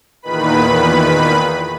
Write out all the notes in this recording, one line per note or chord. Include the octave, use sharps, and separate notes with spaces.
E2 A#2 D#3 B4 B5